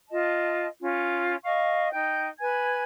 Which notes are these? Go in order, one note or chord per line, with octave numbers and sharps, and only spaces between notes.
F4 D#5 A5
C#4 F4
D#5 F5 C#6
D#4 G5 G6
B4 G#5 G#6